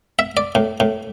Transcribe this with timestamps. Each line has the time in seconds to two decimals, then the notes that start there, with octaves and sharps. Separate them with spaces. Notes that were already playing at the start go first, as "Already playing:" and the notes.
0.19 E5
0.37 D5
0.55 A2
0.80 A2